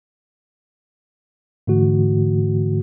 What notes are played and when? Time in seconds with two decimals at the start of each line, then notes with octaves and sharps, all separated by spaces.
1.67 G#2 D3 E3 A3 F#4